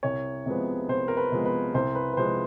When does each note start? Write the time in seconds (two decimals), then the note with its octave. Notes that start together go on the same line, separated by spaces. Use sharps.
0.03 C2 C#5
0.46 C3 F3 G#3 B3
0.89 C2 C5
1.08 A#4
1.17 B4
1.32 C3 F3 G#3 B3
1.45 B4
1.74 C2 C5
1.95 B4
2.13 B4
2.17 C3 F3 G#3 C5